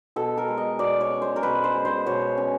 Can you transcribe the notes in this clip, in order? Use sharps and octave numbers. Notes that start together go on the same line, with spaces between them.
B2 A4
A#4
G#3
D#5
B2 D5
C#5
C#4
C5
A#4
B2 B4
C5
G#3
C5
B2 C#5
C#4